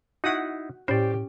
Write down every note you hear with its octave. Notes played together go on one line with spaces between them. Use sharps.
D#4 E4 F#4 F#5 D#6
A2 C#4 G4 C5 D5